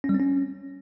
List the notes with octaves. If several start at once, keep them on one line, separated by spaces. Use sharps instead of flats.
C#4
G3
C4
C#4